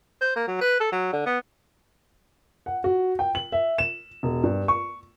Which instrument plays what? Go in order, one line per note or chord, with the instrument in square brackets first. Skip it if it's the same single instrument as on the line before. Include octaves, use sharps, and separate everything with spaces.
[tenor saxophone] C5
A#3
F#3
B4
A4
F#3
D3
B3
[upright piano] F#5
F#4
G5
F#7
E5
E7
E1
G2
C#6